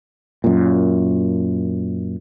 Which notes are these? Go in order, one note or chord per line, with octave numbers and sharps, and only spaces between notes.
F#2 A#2